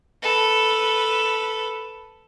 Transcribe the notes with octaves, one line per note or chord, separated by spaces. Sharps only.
A4 B4